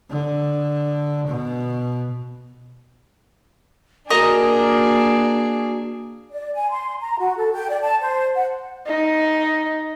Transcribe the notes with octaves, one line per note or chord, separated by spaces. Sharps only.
D3
B2
A#3 D4 F#4 G#4 A#4 D#5 A#5
D5
G#5
C6
A#5
F#4
A4
G5
D5
A5
C5
F#5
D#4